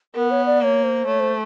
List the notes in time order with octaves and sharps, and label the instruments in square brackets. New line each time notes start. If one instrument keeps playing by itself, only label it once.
[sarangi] B3 [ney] A#4
[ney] C#5
D5
[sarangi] A#3 [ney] C#5 D5
[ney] C5
[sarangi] A3 [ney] C#5
[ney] C5